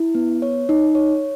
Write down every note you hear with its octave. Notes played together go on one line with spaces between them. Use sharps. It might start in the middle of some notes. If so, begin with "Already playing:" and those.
Already playing: E4
B3
C#5
D#4
C#5